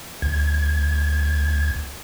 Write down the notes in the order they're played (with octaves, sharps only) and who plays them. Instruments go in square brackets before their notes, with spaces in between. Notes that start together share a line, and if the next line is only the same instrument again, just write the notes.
[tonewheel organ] D2 G#6